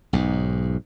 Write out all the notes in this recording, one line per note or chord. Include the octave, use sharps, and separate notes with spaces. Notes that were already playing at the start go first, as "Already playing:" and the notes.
B1 G#2